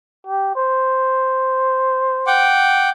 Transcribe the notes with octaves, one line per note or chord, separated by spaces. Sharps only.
G4
C5
F#5 G5 D6